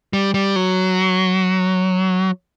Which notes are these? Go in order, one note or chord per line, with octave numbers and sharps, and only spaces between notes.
G3
G3
F#3